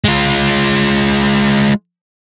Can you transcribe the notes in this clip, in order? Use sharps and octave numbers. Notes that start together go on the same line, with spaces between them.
G#3 F4